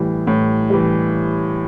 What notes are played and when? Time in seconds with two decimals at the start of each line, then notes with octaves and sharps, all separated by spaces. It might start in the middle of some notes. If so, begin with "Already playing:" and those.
Already playing: A2 E3 G3
0.27 A2
0.70 E3 G3